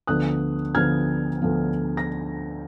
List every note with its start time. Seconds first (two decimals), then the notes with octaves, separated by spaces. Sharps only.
0.07 D2 D3 F3 B3 D#6 F#6
0.75 D2 D3 F3 B3 F6 G#6
1.41 D2 D3 F3 B3
1.97 A#6